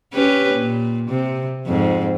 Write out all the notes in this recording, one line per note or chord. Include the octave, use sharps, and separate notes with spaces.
C#4 G4 B4
A#2
C3
F2 G#2